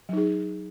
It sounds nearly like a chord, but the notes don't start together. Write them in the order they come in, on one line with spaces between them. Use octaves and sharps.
F#3 D#4 G#4